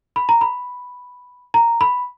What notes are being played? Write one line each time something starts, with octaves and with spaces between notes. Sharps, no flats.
B5
A#5
B5
A#5
B5